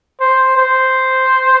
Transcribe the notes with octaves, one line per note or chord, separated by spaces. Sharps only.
C5
C5